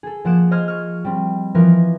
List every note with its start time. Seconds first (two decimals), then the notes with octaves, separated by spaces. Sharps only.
0.03 G#4 A4
0.25 F3 A#3 F#5 C#7 D7 E7
0.51 C5 D#5 C6 F6 G#6
0.68 C#6 F6
1.05 G3 C4
1.54 E3 F3 A#4 B4